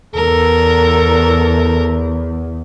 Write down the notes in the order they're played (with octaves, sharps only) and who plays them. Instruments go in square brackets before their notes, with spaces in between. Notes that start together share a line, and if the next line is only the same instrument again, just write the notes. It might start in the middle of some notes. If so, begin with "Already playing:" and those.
[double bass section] E2 [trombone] A4 [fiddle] A#4